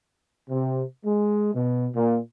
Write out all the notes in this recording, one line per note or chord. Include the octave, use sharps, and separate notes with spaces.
C3
G#3
B2
A#2